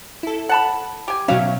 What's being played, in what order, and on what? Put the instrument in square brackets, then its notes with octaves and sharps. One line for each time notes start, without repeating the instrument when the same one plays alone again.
[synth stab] E4 A4
[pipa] F#5 A5 B5
G4 G#5
[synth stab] B2 F#3 C#4 [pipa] D#3 E5 F5